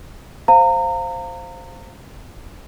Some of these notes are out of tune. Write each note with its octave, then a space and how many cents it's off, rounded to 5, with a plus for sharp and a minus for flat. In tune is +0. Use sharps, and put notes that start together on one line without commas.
C5 +0 F5 +0 A#5 -30